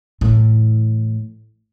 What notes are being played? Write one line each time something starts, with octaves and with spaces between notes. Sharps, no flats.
A2 E3